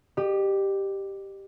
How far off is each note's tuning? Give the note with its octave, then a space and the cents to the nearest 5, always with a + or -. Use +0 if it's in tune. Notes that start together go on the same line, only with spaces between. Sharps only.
G4 +0 D#5 -45